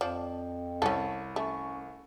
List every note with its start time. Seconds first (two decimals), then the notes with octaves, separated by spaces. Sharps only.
0.01 F2 F3 D4
0.82 C2 C#4 A4
1.36 A3 C#4